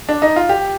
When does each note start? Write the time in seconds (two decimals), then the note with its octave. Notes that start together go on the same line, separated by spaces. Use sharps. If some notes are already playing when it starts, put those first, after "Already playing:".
0.09 D4
0.22 D#4
0.36 F4
0.49 G4